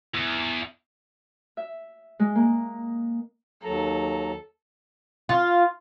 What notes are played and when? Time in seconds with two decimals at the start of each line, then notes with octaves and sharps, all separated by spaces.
0.14 E2
1.57 E5
2.19 G#3
2.35 A#3
3.63 D#2 F#3 A4 A#5
5.29 F4